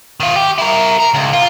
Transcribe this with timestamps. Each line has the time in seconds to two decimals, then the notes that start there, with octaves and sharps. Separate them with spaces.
0.20 D#3 F4
0.36 G4
0.58 E4 A#4
0.99 A#4
1.14 C#2
1.33 F4